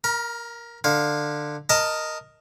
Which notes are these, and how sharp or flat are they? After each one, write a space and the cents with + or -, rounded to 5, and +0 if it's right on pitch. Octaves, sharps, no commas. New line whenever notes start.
A#4 +5 A#5 +40
D3 +20 F5 +15
A#4 +0 D#5 +0 A5 +20